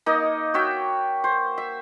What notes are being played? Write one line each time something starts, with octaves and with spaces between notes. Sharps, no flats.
A#3 D#4 D#5
F#4 C#5 E5 G5
C5
E5